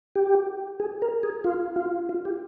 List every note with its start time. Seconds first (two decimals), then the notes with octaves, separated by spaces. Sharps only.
0.16 G4
0.80 G#4
1.02 A#4
1.23 G#4
1.44 F4
1.76 F4
2.09 F4
2.25 G4